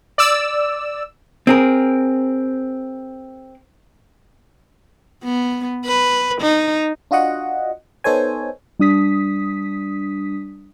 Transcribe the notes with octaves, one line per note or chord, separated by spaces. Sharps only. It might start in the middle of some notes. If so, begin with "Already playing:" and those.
D5 E6
C4 G#4 A#4
B3
B4
D#4
D4 F4 F#4 D#5 F#5
B3 D#4 A4 C5 C#5 G#5
G3 D4 D#6 B6